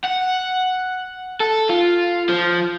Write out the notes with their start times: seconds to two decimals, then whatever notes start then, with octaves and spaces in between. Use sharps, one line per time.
0.04 F#5
1.41 A4
1.70 F4
2.29 F3